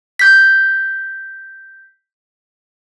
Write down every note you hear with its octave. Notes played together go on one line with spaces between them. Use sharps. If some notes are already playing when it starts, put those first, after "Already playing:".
G6 B6